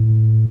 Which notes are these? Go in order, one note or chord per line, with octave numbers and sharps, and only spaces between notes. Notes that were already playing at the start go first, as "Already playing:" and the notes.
Already playing: A2